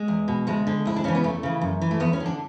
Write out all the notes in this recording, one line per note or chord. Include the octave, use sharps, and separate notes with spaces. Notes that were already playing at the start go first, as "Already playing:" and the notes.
Already playing: G#3
E2
B2
D2 G#3
D3
D2 E4
D4
C#3 E3 C#4
B3
E2 A3
C#3 E3
F#2
E3
A3
E2 B3
C#4
D3
D4